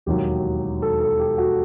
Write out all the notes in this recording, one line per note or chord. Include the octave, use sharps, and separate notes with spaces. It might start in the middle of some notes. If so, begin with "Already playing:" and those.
E1 D#2 D#3 F#3 G4
A4
A4
G4
F#4